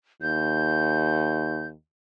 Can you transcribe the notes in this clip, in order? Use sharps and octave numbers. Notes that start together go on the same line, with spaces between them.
D#2 G6